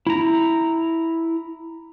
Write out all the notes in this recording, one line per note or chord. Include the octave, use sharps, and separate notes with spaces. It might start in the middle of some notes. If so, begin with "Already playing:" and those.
E4 A#5